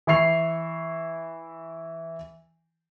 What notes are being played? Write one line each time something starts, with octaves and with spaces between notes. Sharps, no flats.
E3 E4 C#6 C7 F7